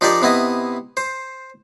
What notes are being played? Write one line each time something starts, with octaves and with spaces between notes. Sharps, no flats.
F3 D4 D#4 G4 A#4 D5
C3 B3 E4 D#5
C5